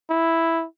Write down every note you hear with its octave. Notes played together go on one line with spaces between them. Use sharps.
E4